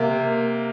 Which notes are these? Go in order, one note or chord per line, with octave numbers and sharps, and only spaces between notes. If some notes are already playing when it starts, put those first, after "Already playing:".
Already playing: C3 A#3